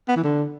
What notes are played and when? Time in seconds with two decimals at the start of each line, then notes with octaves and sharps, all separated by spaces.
0.08 B3
0.16 E3
0.24 D3